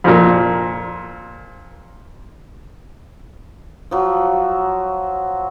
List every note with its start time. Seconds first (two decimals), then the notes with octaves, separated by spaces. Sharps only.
0.04 F2 A#2
3.91 F3 F#3